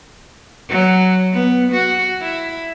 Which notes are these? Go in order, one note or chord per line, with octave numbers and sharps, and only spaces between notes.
F#3
B3
F#4
E4